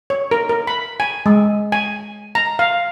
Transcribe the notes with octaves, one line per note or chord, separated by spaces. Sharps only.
C#5
A#4
A#4
B5
G#5
G#3
G#5
A#5
F5